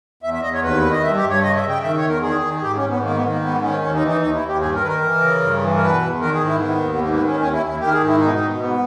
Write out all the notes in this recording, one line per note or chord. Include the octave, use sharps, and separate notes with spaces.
E2 E5
E5
E2 D#5
C#5
D#2 B4
D#3
D#5
G2 E5
G4
G2
C#5
C#3 D#5
E5
C#3
G5
D#3 E5
C#5
E2
A#4
D#3 G#4
D#3
G#4
G#2 G4
C#4
G#2
B3
D#3 A#3
B3
D#3
A#3
G#2 B3
D#3 C#4
D#2 C#4
D#4
E3
D#4
D#2 D#4
E4
D#2
G4
G2 G#4
A#4
D#3 B4
A#4
E3
C#3
G2
E3
A#4
B2 B4
E2
D#3 A#4
G#4
G#2
E4
D#3 B3
D#2
B3
G#2 A#3
B3
D#3
C#4
D#2 C#4
E4
D#2
E4
D#3 G4
A#4
G#4
G#2
E4
B2 D#4
B2
G#2 B3